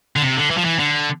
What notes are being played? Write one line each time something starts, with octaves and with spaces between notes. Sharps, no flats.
D3
C3
D3
E3
F3
E3
D3